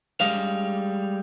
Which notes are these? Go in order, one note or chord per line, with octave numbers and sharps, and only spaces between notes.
G3 G#3 F5